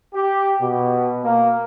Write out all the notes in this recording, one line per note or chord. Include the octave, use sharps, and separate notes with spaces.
G4
B2
A#3